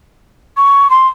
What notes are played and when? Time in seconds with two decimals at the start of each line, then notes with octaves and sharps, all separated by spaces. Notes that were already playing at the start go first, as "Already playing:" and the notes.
0.57 C#6
0.90 C6